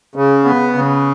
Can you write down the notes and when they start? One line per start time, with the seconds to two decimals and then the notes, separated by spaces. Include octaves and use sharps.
0.16 C#3
0.45 B3
0.75 C#3